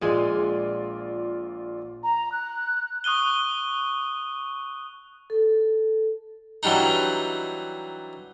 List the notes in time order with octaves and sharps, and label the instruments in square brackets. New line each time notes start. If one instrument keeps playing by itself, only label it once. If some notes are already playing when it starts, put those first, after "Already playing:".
[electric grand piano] A#1 F4 D5 [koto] A#2 G#3 G#5
[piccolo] A#5
F#6
[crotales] C#6 D#6 F#6 D#7 G7
[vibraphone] A4
[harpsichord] E3 F#3 G3 D4 D#4